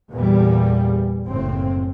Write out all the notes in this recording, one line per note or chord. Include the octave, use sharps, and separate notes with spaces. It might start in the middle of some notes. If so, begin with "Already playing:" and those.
E2 A#2 G3
F#1 A2 C4